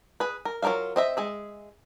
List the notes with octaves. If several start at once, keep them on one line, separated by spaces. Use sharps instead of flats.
G#4 B4
A#4
F#3 F4 A#4 E5 F5
C4 D#5 E5
G#3 G#4 E5